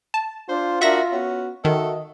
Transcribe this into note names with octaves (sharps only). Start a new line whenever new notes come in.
A5
D4 F4 C5
D4 F#4 A#4 E5 A#6
B3 C#4 F#4
D#3 F#4 A4 D#5 E5